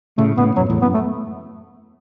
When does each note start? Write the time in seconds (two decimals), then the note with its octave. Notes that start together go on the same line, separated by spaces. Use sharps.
0.18 A2 C#3 A3
0.37 A2 C#3 B3
0.56 F#2 B2 F#3
0.70 E2 A2
0.82 F#2 B3
0.94 A3